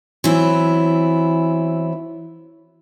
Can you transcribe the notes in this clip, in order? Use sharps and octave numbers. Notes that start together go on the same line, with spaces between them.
E3 F#3 B3 C4 E4